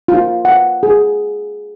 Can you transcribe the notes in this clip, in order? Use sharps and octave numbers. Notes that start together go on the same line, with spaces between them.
F4
F#5
G#4